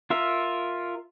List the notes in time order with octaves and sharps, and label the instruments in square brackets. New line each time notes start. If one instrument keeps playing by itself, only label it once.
[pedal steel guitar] F4 A#4 E5